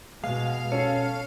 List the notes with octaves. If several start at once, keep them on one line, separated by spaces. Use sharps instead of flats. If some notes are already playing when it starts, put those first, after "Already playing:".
B2 G#3 F5
C#4 A4